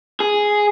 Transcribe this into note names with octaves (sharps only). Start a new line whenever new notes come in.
G#4